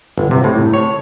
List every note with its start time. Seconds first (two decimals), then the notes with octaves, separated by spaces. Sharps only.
0.18 G1
0.31 C3
0.44 A2
0.74 C#5